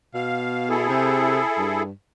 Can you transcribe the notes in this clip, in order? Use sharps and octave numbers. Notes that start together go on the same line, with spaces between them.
B2 F5
E4 G#4 A4
C3
G2